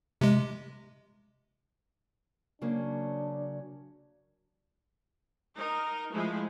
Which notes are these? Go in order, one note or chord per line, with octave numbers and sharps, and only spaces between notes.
C3 G#3
C#3 F#3 A#3 D4
D#4 A#4
F3 G#3 A3 E4